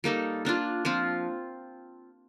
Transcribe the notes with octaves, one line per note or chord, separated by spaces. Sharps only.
G3 A#3 D#4 A4
A#3 D4 F4
F3 C4 F4